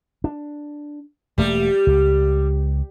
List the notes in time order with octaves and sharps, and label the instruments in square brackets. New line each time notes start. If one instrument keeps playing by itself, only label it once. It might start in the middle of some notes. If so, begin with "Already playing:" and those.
[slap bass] D4
[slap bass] E1 A3 A#3 [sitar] G3
[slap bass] C#2